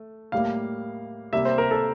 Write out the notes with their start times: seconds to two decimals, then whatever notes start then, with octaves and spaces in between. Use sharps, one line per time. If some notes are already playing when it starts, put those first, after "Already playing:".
Already playing: A3
0.32 A2 G3 A#3 F5
1.33 C3 G3 A#3 E5
1.45 C5
1.58 A#4
1.71 A4